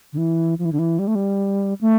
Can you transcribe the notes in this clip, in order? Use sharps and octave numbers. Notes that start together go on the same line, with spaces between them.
D3
E3
F3
E3
D3
E3
G3
A3
G3
A3